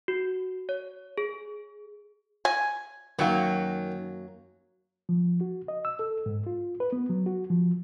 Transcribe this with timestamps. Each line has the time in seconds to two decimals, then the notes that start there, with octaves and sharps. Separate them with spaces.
0.08 F#4
0.69 C#5
1.18 G#4
2.45 G#5
3.19 F#2 D#3 F#3 A#3
5.09 F3
5.41 F#4
5.68 D#5
5.85 E6
5.99 A4
6.26 G#2
6.47 F4
6.80 B4
6.93 B3
7.10 F#3
7.26 F#4
7.50 F3